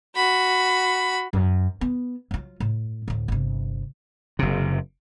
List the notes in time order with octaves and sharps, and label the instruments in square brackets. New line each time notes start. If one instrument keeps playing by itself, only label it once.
[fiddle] F#4 B5
[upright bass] F#2
B3
F#3 F4
A2
D2 A2
G1 C3
[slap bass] F#1 C3